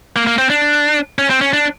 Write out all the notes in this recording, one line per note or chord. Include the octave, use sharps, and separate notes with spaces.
A#3
A#3
C4
D4
C#4
C4
C#4
D4